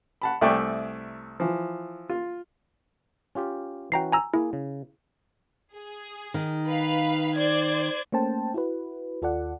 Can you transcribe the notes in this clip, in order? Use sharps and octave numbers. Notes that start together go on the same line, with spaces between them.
F#5 A5 B5
C2 A3 D5 E5 G5 G#5
E3 F3
F4
C#4 F4 G4
E3 C#4 F#4 G5 A#5 C7
G#5 A#5 E6
A#3 E4 G#4
C#3
G#4
D#3
B4 F5
C5 D5 G#6
A3 A#3 C#4 C5 G5 A5
E4 F#4 B4
D#2 F4 A4 D5 F#5